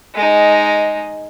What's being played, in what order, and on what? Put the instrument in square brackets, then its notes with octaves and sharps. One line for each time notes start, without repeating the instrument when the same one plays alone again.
[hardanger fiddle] G#3 D#4